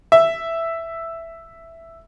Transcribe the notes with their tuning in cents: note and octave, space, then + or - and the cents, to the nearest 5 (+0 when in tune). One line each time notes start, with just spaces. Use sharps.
E5 +5